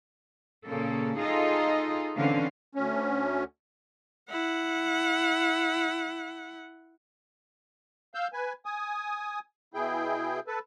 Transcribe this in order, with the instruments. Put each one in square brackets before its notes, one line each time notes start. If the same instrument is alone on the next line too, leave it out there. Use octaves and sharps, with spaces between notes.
[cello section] A#2 C#3 A#3 A4
D#4 F4 G#4 A4 D#5
D3 E3 C4 C#4 F5
[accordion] D2 C#4
[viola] E4 F#5
[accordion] F5 E6 G6
B4 G#5
G#5 D#6
B2 E4 G#4 G5
A4 B4